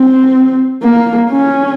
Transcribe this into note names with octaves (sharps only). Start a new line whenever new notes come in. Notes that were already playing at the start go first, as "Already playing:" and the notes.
Already playing: C4
A#3
C#4